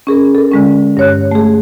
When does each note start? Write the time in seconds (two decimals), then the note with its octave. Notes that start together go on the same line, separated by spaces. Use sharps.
0.07 C#4 G#4 A#4
0.35 A4 A#4
0.52 D3 G#3 C#4
0.97 G2 C#5 F#6
1.31 A3 G#4